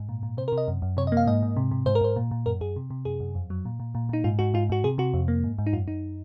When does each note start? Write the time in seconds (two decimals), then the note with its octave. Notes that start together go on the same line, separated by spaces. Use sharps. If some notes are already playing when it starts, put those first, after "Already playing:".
Already playing: G#2
0.09 A#2
0.23 A#2
0.37 C3 C5
0.48 A#4
0.52 C3
0.58 D#5
0.68 F#2
0.82 F#2
0.97 C3 C#5
1.07 D#5
1.12 A#3 F5
1.27 G#2 D#5
1.43 G#2
1.57 C3
1.71 C3
1.86 G#2 C5
1.95 A#4
2.01 G#2 C5
2.16 A#2
2.31 A#2
2.46 F#2 A#4
2.61 F#2 G#4
2.76 C3
2.90 C3
3.05 F#2 G#4
3.20 F#2
3.35 F2
3.50 F#3
3.65 A#2
3.80 A#2
3.95 A#2
4.09 A#2 D#4
4.24 G#2 F4
4.39 G#2 F#4
4.54 G#2 F4
4.70 G#2 F#4
4.84 C3 G#4
4.98 C3 F#4
5.14 F2
5.28 A#3
5.44 G#2
5.59 G#2
5.67 D#4
5.73 F#2 F4
5.88 F#2 D#4